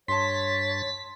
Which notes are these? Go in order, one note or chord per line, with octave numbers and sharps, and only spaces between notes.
G2 C#5 A5 C6 A6 B6